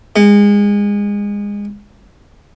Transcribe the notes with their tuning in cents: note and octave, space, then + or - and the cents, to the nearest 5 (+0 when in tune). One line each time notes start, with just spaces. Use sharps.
G#3 -25